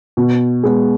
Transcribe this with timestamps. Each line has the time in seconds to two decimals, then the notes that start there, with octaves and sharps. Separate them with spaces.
0.17 B2
0.63 G#3 B3